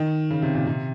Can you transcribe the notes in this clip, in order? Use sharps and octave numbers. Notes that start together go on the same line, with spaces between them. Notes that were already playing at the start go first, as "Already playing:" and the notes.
Already playing: D#3
C#3
C3
A#2
C3